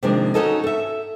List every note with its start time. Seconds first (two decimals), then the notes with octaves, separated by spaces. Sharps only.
0.03 C3 D#3 F3 G#3 A#3 D4
0.34 C#4 D#4 F#4 A4 C#5 D#5
0.64 A4 E5